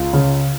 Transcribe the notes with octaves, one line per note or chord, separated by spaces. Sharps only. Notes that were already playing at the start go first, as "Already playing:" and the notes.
Already playing: C#2 F4
C#3